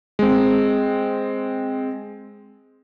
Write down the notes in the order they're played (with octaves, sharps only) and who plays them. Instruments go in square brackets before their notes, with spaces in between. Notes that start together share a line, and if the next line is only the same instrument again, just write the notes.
[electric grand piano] G#3 C4